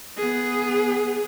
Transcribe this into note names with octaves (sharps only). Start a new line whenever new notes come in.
B3 G#4